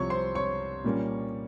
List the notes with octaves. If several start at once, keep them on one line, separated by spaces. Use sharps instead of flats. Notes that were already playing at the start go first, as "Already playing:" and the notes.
Already playing: C2 C3 F3 C#5 C#6
C5 C6
C#5 C#6
A#2 G3 A#3 C#4